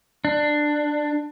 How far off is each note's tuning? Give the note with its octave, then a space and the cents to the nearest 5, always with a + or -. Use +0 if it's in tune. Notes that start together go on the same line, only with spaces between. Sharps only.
D4 +15